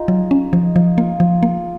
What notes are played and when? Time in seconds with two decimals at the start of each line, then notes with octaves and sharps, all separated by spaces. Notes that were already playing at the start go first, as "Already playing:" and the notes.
Already playing: D#4 F4 G#4
0.08 F#3
0.31 C#4
0.53 F3 D#4
0.75 F3 F4
0.97 A#3 F4
1.20 F3
1.43 A#3